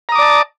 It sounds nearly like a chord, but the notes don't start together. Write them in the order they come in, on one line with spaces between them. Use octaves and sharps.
A#5 D#6 D6 D5 A5